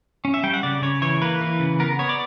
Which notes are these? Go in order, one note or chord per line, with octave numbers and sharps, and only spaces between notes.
C#4
E5
G3 G5
F#5
C#3 D5
C#3 C#5
E3 C#5
A#3 B4
E3
C#3
B3 A#4
B3 C#5
D5